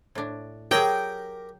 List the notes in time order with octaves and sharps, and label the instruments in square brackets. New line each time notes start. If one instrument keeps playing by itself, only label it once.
[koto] A2 D4
[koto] F#3 G#4 [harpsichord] G4 A#4 A#5 [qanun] G5